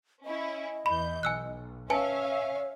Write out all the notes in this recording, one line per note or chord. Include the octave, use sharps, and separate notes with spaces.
C#4 E4 D#5
E2 E3 B5 G6
B1 G#5 E6 F#6
C#4 B4 C#5 E5 F5 G#5 A5